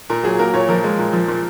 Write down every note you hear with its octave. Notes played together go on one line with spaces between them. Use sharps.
A#2 A#4
F#3 G#4
A#3 A#4
A#2 C#5
F3 A#4
G#3
A#2
F3
A#2